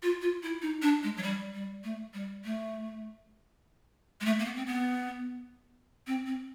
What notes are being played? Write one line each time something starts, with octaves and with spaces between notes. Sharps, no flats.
F4
F4
E4
D#4
D4
G#3
F#3
G3
G3
A3
G3
A3
G#3
A3
A#3
B3
C4
B3
C4
C4